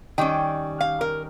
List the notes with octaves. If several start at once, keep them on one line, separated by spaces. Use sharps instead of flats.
D#3 G3 C#4 G5
F5
A#4